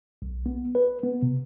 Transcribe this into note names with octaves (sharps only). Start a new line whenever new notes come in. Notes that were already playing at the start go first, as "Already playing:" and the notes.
B1
B3
B4
B3
C3